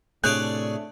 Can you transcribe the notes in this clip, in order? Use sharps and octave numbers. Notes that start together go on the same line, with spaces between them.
A2 C3 A3 D4 G#4 C#5 D5 F#6